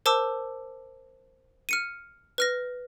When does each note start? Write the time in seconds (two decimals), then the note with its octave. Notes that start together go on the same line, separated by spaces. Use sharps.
0.06 A#4 C5 A5 D6 E6
1.69 F6 C#7 D#7
2.38 B4 F6 A#6